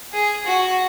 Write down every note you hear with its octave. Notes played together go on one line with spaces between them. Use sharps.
G#4
F#4